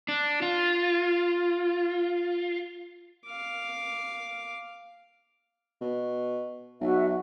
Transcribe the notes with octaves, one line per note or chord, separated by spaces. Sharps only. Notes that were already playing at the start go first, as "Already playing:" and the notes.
D4
F4
F5 D6
B2
B1 F#4 E5